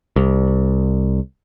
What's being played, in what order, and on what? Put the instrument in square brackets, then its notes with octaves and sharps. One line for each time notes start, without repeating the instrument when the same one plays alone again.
[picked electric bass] C2